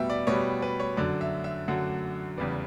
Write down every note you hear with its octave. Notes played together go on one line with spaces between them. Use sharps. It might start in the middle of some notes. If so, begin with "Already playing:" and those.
Already playing: B2 G3 B3 E5 G5
D5
B2 G3 B3 C#5
B4
C#5
F#2 D3 F#3 D5
E5
E5
F#2 D3 F#3 F#5
E2 C#3 G3 B3 D5